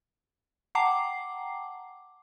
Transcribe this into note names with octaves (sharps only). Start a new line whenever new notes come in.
F#5 G5 A5 A#5 D6 C7